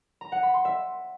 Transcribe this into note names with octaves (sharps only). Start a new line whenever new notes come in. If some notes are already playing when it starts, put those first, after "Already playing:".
A#5
F#5
B5
C6
E5